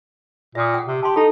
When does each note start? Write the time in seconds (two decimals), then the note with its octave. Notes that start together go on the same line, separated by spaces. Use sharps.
0.55 A#2 E5 D#6
0.74 F#5 G5
0.87 C3
1.03 G4 A5 C6
1.16 D#4 A4 A5 A#5